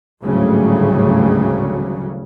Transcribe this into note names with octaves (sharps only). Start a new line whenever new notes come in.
G#1 D2 A2 C#3 F#3 G3